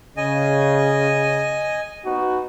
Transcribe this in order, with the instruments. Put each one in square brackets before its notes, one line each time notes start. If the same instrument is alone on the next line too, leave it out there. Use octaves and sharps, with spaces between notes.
[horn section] C#3 [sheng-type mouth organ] D#5 G#5
[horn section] B3 D#4 F#4